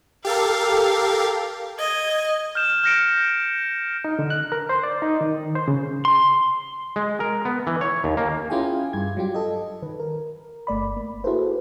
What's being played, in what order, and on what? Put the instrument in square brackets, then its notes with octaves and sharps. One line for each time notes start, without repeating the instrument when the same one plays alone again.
[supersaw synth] G4 A4 A#4 [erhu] F5
[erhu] D#5 [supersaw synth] G#6
[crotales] F6 G6 E7
F6 G6 A#6 C#7 D7
[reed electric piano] D#4
D3
F#6
A#4
C5
D5
D#4
D#3
C5
C#3
[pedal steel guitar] C6
[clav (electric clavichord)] G#3
A#4
B3
E3
C#5
D#2
A#3
[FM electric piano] C#4 E4 F4 G#4 G5 G#5
G2 G#6
F#3 G3 F4 G4
A4 D#5
D#3 B4
A#4
G1 A3 D5 B5
A#3
E4 F#4 G#4 A4 B4 C5